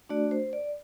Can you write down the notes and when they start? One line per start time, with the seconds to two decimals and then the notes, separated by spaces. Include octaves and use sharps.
0.09 A3 D4 F#4 D5
0.31 C5
0.53 D5